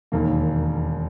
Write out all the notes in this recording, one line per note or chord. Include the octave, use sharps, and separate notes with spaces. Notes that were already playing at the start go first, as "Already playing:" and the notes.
E1 D#2 D#3 A#3